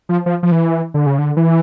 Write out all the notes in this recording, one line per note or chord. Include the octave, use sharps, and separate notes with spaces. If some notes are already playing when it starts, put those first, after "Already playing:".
F3
F3
F3
E3
D3
C#3
D3
E3